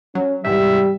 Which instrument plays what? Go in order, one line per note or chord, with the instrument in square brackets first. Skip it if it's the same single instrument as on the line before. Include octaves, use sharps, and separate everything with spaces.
[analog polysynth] F#3 [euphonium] C#4
[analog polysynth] E2 G#2 C3 [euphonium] G3 [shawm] E5